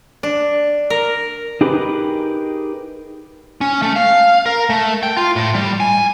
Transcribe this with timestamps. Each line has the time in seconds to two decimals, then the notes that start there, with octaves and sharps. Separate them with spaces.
0.23 D4
0.90 A#4
1.61 D#4 G4 G#4 A#4 B4
3.61 C#4
3.82 A3
3.96 F5
4.46 A#4
4.70 A3
5.03 G5
5.17 F4
5.36 A2
5.55 G3
5.80 G#5